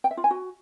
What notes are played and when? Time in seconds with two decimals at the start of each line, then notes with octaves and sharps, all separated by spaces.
0.04 G5
0.11 E5
0.17 F4
0.24 G#5
0.31 F#4